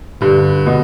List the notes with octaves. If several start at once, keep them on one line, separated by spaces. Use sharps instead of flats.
G2 D3
B2